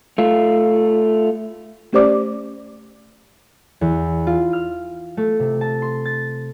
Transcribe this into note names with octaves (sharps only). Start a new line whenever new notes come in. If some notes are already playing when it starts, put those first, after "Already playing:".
A3 F4
A3 C#4 G4 C5 D5 D6
E2
F4
F6
A3
C3
A5
C6
A6